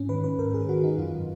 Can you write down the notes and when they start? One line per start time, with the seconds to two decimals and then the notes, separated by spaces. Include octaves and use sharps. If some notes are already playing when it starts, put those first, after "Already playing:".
Already playing: G#2 C#4
0.09 D#3 B4
0.24 B4
0.39 G#2 A#4
0.54 G#4
0.69 D#3 F#4
0.84 D#4
0.98 F#2 F4